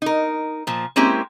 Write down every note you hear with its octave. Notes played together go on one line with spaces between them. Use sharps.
D#4 A#4
A#2 F3
G#3 A#3 C4 C#4 E4 G4